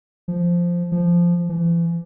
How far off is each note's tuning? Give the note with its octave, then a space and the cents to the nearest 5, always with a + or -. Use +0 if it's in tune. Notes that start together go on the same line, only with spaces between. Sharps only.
F3 -5
F3 -10
E3 +40